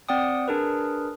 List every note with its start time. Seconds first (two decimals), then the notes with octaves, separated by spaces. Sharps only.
0.09 C4 D5 F#5 G5 D#6
0.48 D4 G#4 A#4 B4